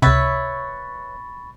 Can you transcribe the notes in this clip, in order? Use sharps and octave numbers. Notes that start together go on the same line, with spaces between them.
C#2 C3 B4 C#5 E5 B5 C#6 A6